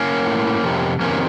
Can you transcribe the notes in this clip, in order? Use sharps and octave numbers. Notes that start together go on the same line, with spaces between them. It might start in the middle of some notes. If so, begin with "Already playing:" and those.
Already playing: A#3 C#4
A2
F2 C3
F2 C3 D#3 A#3 C#4